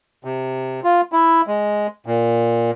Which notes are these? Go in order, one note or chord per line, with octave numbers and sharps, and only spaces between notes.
C3
F4
E4
G#3
A#2